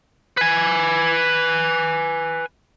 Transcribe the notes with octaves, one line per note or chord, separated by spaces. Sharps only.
B4 G#5